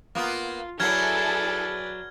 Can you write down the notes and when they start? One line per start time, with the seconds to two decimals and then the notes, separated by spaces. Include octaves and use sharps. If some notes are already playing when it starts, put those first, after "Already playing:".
0.15 A#3 B3 F4
0.80 F#3 E4 G#4 A4 B4 D5 F6 G#6